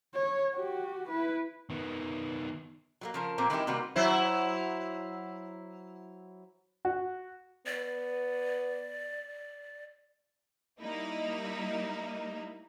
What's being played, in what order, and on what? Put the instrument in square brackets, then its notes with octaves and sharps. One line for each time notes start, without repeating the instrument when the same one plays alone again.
[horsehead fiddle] C#5
F#4 G4
E4 B4
[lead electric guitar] D#3 B3
[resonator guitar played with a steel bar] F#3 G3 A#3
C#3 F3 A#4
A#2 A#3 C4
D#3 E3 G#3 C#4 E4 G4
C3 G3 A#3 F#4 B4
[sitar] F#3 E4 C5
[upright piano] F#4
[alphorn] B3 [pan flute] D5
[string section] G3 A#3 D#4 E4